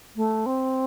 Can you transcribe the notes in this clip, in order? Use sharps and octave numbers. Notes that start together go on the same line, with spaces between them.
A3
C4